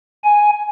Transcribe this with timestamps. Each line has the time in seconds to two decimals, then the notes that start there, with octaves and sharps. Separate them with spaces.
0.24 G#5